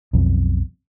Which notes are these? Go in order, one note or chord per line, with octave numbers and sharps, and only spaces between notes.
B1 F2